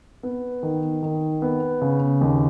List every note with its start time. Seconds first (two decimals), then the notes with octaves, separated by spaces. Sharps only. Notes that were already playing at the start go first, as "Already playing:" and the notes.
0.23 B3
0.63 D#3
1.02 D#3
1.42 B3
1.81 C#3
2.21 D#2